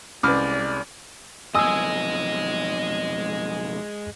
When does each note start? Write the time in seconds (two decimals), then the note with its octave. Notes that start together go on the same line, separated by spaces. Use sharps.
0.23 C2 G#3 C#4 B4 D5 D6 F6
1.55 B1 F2 G#3 D#5 G#5 D#6 E6